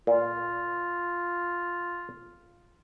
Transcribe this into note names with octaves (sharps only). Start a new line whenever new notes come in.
A#2 F4